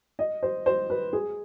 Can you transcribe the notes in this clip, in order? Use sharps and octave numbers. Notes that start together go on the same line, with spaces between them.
D#5
C5
C5
B4
G#4